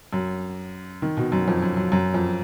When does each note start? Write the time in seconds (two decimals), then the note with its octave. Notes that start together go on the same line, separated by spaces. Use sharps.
0.13 F#2
1.02 D#3
1.17 B2
1.32 F#2
1.48 F2
1.62 F#2
1.77 F#2
1.92 F#2
2.14 F2